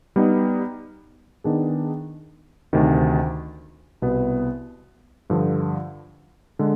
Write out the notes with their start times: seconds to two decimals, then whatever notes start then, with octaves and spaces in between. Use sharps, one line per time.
0.16 G3 B3 D#4
1.44 D#3 B3 D4 G#4
2.73 D2 C3 D#3
4.02 C2 B2 B3
5.30 G2 D3 F3
6.59 D3 G#3